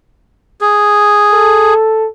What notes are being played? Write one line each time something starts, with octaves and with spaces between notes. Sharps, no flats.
G#4
A4